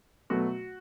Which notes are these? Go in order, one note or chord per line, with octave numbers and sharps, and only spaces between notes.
B2 F#3 A3 F#4